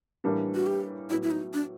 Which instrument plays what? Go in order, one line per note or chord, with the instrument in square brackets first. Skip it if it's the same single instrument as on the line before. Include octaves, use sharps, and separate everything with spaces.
[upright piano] A2 E3 G3 A#3 D4
[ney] F#4
G4
[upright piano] A2 F#3 B3 [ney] E4
[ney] E4
D#4
D4